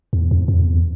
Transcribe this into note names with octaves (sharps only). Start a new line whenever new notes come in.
E2
F2
F2
E2